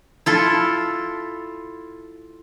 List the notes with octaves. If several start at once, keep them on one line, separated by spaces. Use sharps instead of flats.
E4 F4 A4